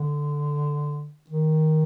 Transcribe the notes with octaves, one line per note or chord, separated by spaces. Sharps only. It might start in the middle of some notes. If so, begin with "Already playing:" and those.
Already playing: D3
D#3